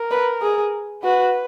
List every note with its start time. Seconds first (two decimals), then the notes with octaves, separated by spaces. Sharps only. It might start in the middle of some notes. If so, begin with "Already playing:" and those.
Already playing: A#4
0.11 B4
0.42 G#4
1.04 F#4 B4